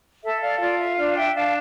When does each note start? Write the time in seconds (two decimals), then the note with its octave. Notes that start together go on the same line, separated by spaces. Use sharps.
0.23 A4 E5
0.42 D5 F5
0.60 F4 D5
0.78 E5
0.97 D4 D5 F5
1.15 E5 G5
1.33 D4 F5 A5